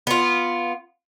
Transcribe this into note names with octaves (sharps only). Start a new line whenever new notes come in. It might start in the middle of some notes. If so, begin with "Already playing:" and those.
B3 F4